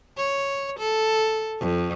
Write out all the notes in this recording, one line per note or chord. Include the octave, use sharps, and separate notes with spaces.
C#5
A4
F2